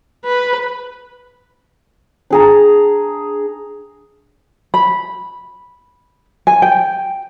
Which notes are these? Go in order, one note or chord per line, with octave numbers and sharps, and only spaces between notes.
B4
D4 G#4 A#5
B5
G#5
G5